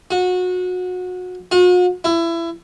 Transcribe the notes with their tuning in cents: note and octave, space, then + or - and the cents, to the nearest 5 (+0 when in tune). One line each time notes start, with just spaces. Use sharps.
F#4 -25
F#4 -45
E4 +25